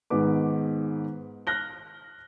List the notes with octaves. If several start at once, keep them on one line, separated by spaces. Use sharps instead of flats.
G#2 D#3 B3 B4 D6
F6 F#6 A#6 G7